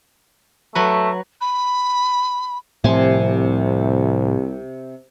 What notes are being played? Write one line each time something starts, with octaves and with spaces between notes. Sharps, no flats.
F#3 A3 B4
B5
C2 A2 C3 F3 G#5 C6